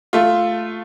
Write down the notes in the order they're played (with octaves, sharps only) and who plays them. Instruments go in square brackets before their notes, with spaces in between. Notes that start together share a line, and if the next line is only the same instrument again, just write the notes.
[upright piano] A3 F4